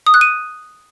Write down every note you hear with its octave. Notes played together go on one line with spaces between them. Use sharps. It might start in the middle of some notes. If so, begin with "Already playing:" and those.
D#6
F#6
D#7